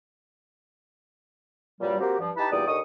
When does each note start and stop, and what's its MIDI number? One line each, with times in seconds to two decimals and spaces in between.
1.81 1.96 43
1.81 1.96 46
1.81 1.96 54
1.81 1.96 55
2.00 2.18 58
2.00 2.18 60
2.00 2.18 66
2.00 2.18 67
2.19 2.30 43
2.19 2.30 53
2.37 2.47 63
2.37 2.47 64
2.37 2.47 67
2.37 2.47 71
2.37 2.47 81
2.37 2.47 83
2.51 2.65 40
2.51 2.65 46
2.51 2.65 55
2.51 2.65 63
2.51 2.65 74
2.51 2.65 87
2.67 2.78 39
2.67 2.78 50
2.67 2.78 63
2.67 2.78 85
2.67 2.78 87